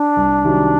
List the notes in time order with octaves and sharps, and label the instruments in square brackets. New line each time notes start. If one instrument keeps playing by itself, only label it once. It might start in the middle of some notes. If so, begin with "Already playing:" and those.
Already playing: [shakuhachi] D4
[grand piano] C2
C3 D#3 F#3